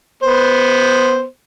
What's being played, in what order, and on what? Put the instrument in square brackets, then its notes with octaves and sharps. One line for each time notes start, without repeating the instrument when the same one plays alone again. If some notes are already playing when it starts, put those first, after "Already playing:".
[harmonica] B3 C5